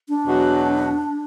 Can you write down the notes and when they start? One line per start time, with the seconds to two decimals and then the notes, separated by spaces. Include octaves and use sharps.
0.09 D4
0.25 E2 B2 F#3 B3 F#4